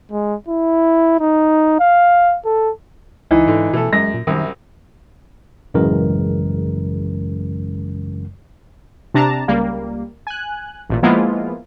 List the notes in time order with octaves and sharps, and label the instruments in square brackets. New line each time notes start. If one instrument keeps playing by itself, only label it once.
[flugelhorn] G#3
E4
D#4
F5
A4
[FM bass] C#2 [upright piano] E3 D#4
[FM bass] G#2 [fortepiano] D3
[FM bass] B2 [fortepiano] E3 A3 A4
[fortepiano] F#2 [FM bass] G#3 [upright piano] A#6
[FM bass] A#2
[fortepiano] C2 F#2 [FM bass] D#3
[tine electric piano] A1 F#2 C#3 E3 G#3 A#4
[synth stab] C3 D4 A5 A#5
C#2 G3 A#3
G#5 F#6
A1 A#2
F3 G#3 A#3 B3 E4 F4